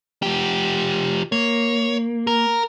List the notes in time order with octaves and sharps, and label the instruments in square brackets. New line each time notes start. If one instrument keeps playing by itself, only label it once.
[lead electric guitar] F3 G4
[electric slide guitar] A#3 [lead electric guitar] C#5
[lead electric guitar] A#4